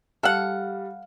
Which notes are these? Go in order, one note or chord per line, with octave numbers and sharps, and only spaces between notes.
G3 A4 F5 F#5